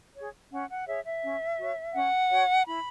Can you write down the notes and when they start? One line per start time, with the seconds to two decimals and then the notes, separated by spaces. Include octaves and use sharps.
0.15 G#4 C#5
0.51 C#4 F#5
0.70 F#5
0.87 G#4 C#5 E5
1.05 E5
1.23 C#4
1.59 F#4 C#5
1.94 C#4 F#5
2.31 F#4 C#5
2.66 E4 B5